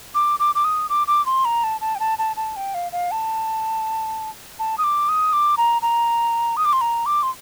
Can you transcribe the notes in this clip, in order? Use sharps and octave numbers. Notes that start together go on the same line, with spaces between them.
D6
D6
D6
D#6
D6
D6
C6
A#5
A5
A5
G5
A5
A5
A5
G5
F5
F5
A5
A5
D#6
D6
D#6
D6
A#5
A#5
D#6
D6
C6
A#5
D6
C6